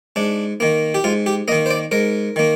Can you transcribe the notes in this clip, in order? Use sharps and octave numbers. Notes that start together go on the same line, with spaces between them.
G#2 D4
D#3 A#3
G4
G#2 F4
G4
D#3 A#3 D#5
C5
D5
G#2 A#4
D#3 A#3